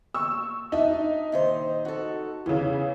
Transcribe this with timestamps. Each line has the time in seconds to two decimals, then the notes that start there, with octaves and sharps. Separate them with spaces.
0.14 A#2 C#6 E6
0.72 D4 D#4 E5
1.32 A#2 D#3 C5
1.85 F#4 A4
2.46 E2 C#3 E3 F5